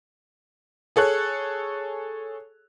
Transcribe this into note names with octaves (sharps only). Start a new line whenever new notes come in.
G#4 A4 C#5 F#6